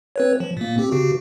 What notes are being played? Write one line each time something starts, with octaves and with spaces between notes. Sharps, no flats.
C4 B4 C#5
F3
A#2 A#3
C4 G4
C#3 F#4 G4